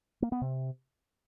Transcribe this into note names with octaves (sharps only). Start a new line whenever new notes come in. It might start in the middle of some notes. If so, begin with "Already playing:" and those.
A#3
B3
C3